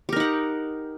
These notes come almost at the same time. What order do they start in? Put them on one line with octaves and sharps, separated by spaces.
G4 A#4 D#4 F#5